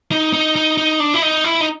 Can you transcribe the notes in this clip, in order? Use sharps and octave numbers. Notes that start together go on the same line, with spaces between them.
D#4
D#4
D#4
D#4
D4
E4
D#4
E4
D#4